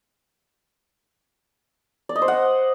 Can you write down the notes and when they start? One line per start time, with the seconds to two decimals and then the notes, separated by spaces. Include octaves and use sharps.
2.09 D5
2.16 D#5
2.22 C5
2.28 F#5